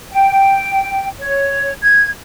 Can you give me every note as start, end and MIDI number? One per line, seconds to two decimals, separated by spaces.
0.11 1.06 79
1.18 1.73 73
1.82 2.08 92